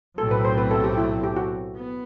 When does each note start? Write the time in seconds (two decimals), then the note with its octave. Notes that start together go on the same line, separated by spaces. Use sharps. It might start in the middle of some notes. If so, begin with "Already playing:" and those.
0.18 B1 A2 F#3 A3 C4 A4
0.31 B4
0.45 C5
0.58 B4
0.71 A4
0.84 G4
0.97 E4
1.23 G4
1.36 F#4
1.75 B3